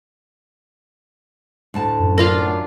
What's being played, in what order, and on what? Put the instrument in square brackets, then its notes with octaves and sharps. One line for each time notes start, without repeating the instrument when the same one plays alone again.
[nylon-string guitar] D2 A2 A5
[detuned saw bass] F#2
[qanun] D4 F4 F5 [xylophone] A#4 A#6